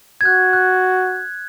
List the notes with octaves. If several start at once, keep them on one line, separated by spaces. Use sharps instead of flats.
G#6
F#4 F#6
F#6